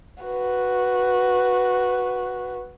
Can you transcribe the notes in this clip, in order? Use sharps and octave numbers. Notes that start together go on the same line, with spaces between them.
F#4 B4